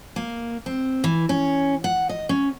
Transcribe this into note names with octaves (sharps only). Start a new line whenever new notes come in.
A#3
C4
E3
C#4
F#5
D#5
C#4